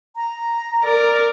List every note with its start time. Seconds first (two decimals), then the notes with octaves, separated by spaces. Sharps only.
0.16 A#5
0.84 A#4 D5